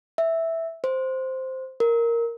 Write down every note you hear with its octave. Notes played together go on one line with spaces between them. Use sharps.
E5
C5
A#4